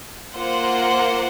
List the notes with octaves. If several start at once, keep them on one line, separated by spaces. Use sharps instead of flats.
A#3 F4 C5 F#5